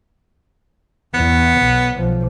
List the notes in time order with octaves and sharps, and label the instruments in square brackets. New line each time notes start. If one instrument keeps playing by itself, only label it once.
[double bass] E2 [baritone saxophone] B3
[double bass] B1
B1 F3